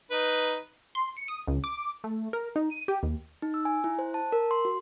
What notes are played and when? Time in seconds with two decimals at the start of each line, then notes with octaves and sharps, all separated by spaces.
0.11 D#4 B4
0.95 C6
1.17 C#7
1.28 D#6
1.47 C#2
1.64 D6
2.04 A3
2.33 A#4
2.56 D#4
2.70 D#7
2.88 G4
3.03 D#2
3.42 D#4
3.54 E6
3.65 G#5
3.84 E4
3.99 C5
4.14 A5
4.32 A#4
4.51 C6
4.65 F#4